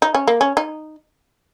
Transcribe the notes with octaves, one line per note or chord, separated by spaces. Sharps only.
D#4
C#4
A#3
C#4
D#4